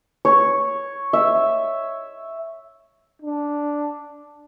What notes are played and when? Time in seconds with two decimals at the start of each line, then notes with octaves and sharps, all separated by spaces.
0.25 C#5
1.13 E5
3.22 D4